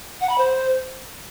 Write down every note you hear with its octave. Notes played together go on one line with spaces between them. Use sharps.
F#5
B5
C5